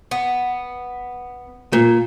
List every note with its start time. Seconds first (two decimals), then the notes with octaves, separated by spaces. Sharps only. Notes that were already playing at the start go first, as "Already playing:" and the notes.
0.11 B3
1.73 A#2